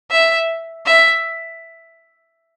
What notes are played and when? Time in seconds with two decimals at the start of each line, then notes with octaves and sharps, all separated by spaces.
0.11 E5
0.86 E5